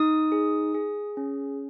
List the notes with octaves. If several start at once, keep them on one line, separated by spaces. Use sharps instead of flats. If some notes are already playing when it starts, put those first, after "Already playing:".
Already playing: D#4 D#6
G#4
G#4
C#4